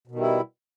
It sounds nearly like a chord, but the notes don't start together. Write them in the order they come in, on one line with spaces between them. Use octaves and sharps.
B2 D#3 G3 E4